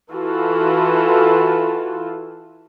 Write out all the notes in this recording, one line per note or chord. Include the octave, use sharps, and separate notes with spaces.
E3 F4 F#4 A4